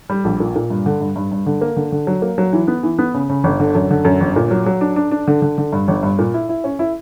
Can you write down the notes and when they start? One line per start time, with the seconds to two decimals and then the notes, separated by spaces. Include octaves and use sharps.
0.10 G3
0.25 A#1
0.40 A#2
0.55 A#2
0.70 G2
0.86 D3
1.01 G2
1.16 G2
1.32 G2
1.46 D3
1.61 A#3
1.77 D3
1.92 D3
2.07 F#3
2.22 A#3
2.38 F#3
2.53 E3
2.68 B3
2.83 E3
2.99 B3
3.14 C#3
3.30 C#3
3.44 G1
3.60 D3
3.75 F#2
3.91 D3
4.05 F#2
4.20 G1
4.36 A#2
4.51 F#3
4.66 F#3
4.81 D4
4.96 D4
5.11 D4
5.27 D3
5.42 D3
5.58 D3
5.73 G2
5.88 G1
6.03 G2
6.19 A#2
6.34 E4
6.49 E4
6.64 C#4
6.79 E4